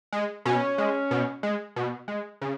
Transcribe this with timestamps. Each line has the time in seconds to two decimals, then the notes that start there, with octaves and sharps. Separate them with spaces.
0.13 G#3
0.45 B2 C#4
0.78 G#3
1.11 B2
1.43 G#3
1.76 B2
2.08 G#3
2.41 C#3